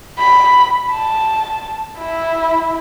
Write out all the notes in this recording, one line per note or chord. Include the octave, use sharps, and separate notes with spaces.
B5
A5
E4